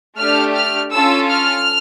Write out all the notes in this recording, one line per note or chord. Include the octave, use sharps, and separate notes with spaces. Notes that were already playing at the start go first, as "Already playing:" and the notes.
A3 D4 G4 F6
F6
C#4 F4 A4 E6
F6